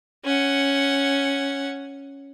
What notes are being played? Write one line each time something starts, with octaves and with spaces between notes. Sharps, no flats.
C#4 F#5